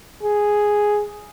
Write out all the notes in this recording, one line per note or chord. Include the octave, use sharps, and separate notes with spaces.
G#4